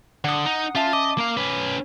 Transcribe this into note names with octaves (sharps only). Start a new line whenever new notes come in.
D3 F#5 D#6
D#4
C#4 F4 E5 A5
D#5 D6
A#3 F5
C#4 B4